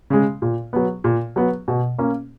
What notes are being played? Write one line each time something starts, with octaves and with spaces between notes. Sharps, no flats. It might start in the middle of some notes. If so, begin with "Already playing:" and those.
C#3 G#3
A#2
F#3 B3
A#2
F#3 B3
B2
A#3 C#4